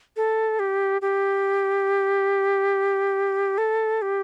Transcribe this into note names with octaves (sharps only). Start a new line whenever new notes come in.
A4
G4
G4
A4
G4